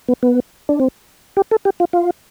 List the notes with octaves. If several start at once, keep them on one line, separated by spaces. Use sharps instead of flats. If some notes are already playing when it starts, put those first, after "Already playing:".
B3
B3
D4
C4
G4
A4
G4
F4
F4